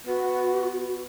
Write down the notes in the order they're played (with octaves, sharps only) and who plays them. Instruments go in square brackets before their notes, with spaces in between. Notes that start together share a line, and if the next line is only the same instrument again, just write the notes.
[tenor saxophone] B3 [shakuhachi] F#4